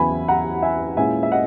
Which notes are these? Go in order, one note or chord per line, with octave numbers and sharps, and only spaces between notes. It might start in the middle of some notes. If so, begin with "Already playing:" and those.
Already playing: E2 C#3 F#3 B3 E4 G#5 B5
F#5 A#5
E5 G#5
A#2 G#3 C#4 E4 E5 G#5
E5
D#5 F#5